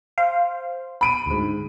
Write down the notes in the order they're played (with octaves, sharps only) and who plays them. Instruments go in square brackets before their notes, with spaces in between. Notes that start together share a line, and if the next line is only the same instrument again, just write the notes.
[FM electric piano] C5 [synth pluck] F5
[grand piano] B5 D7 D#7
[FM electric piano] D2 G#2